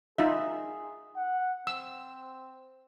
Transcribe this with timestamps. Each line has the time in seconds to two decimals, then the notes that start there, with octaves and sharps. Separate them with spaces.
0.18 D#4 F4 G#4 E5
1.17 F#5
1.67 C4 E6